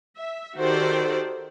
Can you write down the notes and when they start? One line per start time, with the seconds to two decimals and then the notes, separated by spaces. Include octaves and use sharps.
0.17 E5
0.57 D#3 F#4 G4 A4 C5 D5